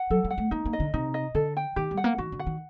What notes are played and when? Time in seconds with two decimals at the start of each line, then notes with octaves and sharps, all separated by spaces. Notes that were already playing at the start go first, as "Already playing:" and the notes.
Already playing: F#5
0.10 F#3 A4
0.25 G3
0.30 F#5
0.38 A3
0.51 A#3 D#4
0.66 A#3
0.73 D#5
0.80 D3
0.94 C3 D#4
1.14 D#5
1.35 D3 A4
1.57 G5
1.76 D#3 G4
1.91 G3
1.97 F#5
2.04 A#3
2.18 D#3 F#4
2.32 D3
2.39 F#5
2.47 D#3